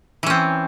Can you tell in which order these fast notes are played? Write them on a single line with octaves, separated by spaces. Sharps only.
E3 C#4 C4